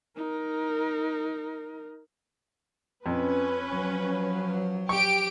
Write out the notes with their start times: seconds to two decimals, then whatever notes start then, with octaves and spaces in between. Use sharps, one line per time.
0.16 D#4 A#4
3.06 F2 C#4 B4
3.69 F3 F#3
4.89 G4 C#6 D7